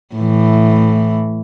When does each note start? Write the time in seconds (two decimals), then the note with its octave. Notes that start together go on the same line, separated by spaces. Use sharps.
0.16 A2 E3